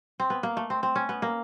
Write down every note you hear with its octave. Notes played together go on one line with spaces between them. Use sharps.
C4
B3
A#3
A3
C4
C4
C#4
B3
A#3